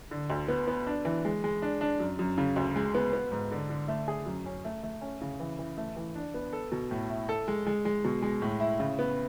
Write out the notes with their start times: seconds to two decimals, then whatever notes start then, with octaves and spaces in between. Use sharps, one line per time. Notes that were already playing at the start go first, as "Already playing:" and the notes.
0.11 D3
0.30 D2
0.48 B3
0.67 B3
0.87 D4
1.05 E3
1.25 G#3
1.44 G#3
1.62 D4
1.81 D4
2.00 F#2
2.19 F#2
2.38 C#3
2.56 D2
2.76 G#3
2.95 B3
3.13 B3
3.32 G#2
3.51 D3
3.70 D3
3.88 A3
4.08 G#4
4.26 F#2
4.46 C#4
4.65 A3
4.83 A3
5.01 C#4
5.21 C#3
5.40 E3
5.59 E3
5.77 A3
5.96 E3
6.15 D4
6.34 B3
6.53 A4
6.72 B2
6.91 A2
7.10 E4
7.29 A4
7.48 G#3
7.66 G#3
7.85 G#3
8.04 B2
8.22 G#3
8.42 A2
8.60 E4
8.80 C#3
8.99 B3